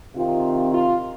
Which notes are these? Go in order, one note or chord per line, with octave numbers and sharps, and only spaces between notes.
C3 D#3 C4 D#4 F4
F4